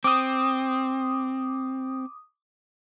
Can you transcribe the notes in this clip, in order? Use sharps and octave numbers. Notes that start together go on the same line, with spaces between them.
C4 D6 D#6